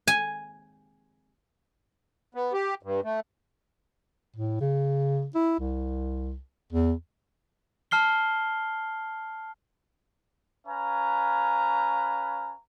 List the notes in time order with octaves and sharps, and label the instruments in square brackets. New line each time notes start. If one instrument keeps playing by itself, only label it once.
[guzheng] G#5
[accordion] B3
G4
G2
A3
[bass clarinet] A2
C#3
E4
C2
E2
[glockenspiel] A5 F6 C7 G7
[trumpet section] C#4 B4 F5 G#5 A#5